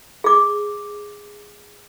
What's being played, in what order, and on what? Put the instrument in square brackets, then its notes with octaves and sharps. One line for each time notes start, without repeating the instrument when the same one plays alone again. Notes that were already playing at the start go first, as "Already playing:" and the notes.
[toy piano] G#4 D6